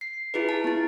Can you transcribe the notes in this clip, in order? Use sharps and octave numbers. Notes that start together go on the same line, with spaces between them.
C7
E4 F4 G#4 B4
A5
B3 E4